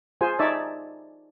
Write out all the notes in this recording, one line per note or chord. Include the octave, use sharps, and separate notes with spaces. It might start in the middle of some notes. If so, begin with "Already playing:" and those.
F4 G#4 C5 G#5
D#4 C#5 D5 E5 A5